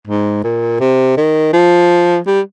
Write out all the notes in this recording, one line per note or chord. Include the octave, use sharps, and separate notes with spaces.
G#2
A#2
C3
D#3
F3
G3